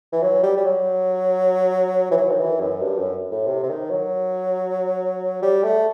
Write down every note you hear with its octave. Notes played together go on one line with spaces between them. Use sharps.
E3
F#3
G3
G3
F#3
E3
F#3
D#3
E3
F#2
G2
F#2
A2
C3
C3
D#3
F#3
G3
A3